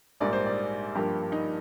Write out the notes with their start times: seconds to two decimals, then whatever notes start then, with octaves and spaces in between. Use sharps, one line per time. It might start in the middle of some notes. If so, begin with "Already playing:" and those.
0.20 A#1 G#2 G3 A#3 D5
0.33 C5
0.46 D5
0.95 G2 F3 A#3 G4
1.32 D#4